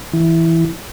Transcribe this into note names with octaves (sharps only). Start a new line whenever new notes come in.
E3